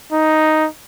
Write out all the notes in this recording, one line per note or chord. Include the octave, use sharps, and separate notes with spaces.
D#4